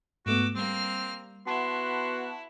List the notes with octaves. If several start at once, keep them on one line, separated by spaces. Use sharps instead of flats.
G#2 A3 B3 F#4 D6 E6
G3 A#3 C4 F6
B3 E4 F#4 A5 C6